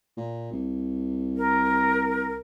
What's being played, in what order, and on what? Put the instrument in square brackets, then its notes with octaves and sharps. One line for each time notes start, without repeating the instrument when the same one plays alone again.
[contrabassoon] A#2
C2
[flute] A#4